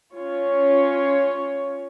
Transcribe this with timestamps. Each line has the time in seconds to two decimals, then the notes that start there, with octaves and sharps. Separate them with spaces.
0.14 C#4 F4 C#5